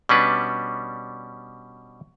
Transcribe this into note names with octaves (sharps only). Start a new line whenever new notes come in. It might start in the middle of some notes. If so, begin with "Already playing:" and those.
B2 G3 C#4 D4 B4